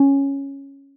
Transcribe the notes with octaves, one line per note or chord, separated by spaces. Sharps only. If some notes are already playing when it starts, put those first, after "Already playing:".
Already playing: C#4